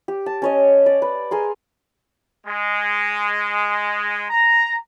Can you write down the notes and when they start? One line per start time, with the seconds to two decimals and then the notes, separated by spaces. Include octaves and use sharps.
0.08 G4
0.26 A5
0.42 C#4 C#5 D#5
0.86 D5
1.02 B4
1.31 G#4 A#4 C6
2.47 G#3
4.30 A#5